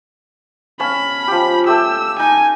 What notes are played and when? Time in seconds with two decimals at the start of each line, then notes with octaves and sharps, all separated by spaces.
0.80 C#4 F5 A5 B5
1.28 F3 G4
1.67 A3 G4 E6
2.19 D#4 G#5